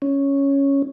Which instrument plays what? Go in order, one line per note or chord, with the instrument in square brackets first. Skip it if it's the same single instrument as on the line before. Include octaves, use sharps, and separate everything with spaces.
[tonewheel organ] C#4